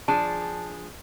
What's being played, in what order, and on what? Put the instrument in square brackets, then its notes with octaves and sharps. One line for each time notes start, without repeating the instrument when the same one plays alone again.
[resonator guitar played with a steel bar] F3 D4 G#4 [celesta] A5